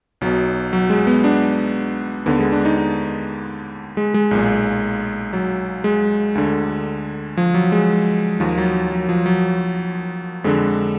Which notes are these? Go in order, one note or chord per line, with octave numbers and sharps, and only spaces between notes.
B1 B2 F#3
F#3
G#3
B3
D4
D#2 D3 B3
G#3
D4
D#4
D#4
G#3
G#3
B1 A#2
F#3
G#3
D2 D3
F3
F#3
G#3
D#2 D#3 F3
F#3
F#3
F3
F#3
F2 D3 G#3